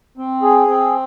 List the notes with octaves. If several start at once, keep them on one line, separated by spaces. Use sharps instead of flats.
C4
G#4
C4